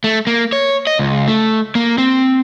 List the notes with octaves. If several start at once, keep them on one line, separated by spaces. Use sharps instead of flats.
A3
A#3
C#5
D#5
C#2
A3
A#3
C4